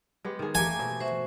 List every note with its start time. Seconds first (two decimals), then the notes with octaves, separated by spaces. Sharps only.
0.25 G#3 B3 G4
0.39 D#3 G#4
0.55 A3 A#3 G4 G#5
0.79 B2 C4
1.00 F#4 C5 E5